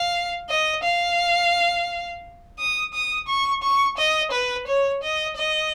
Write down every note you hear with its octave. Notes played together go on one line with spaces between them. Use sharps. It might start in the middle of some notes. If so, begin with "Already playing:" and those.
Already playing: F5
D#5
F5
D#6
D#6
C#6
C#6
D#5
B4
C#5
D#5
D#5